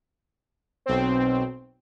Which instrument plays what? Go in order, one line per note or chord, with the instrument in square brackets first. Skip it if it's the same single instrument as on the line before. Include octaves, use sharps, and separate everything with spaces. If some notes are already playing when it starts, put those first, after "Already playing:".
[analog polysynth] B1 C4